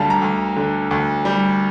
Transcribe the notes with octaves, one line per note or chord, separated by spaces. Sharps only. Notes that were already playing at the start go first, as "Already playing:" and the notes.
Already playing: D2 D3 G3 F5 A5
A#5
D2
D3
D2
G3